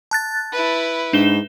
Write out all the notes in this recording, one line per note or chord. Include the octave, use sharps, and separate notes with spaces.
A5 F#6 A6
E4 B4
G#2 D4 E7 G7